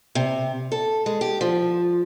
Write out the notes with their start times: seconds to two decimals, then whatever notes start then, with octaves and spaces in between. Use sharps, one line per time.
0.15 C3
0.72 A4
1.06 G#3
1.21 G4
1.41 F3